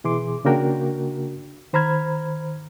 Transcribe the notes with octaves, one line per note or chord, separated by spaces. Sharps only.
B2 E3 G#4 C6 D6
C#3 A#3 D4 F#4 A#4 G5
D#3 C5 A#5 B5 F6 G#6